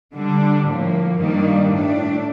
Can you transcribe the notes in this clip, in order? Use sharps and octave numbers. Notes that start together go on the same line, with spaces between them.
D3 G3 D4
A2 F3 A#3
G2 D#3 G3 A#3 D4
A2 A3 D4